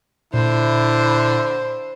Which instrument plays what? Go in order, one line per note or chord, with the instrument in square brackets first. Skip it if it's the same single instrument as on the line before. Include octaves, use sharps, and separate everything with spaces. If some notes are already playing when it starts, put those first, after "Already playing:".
[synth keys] A#2 [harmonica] D3 [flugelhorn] E4 [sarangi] C5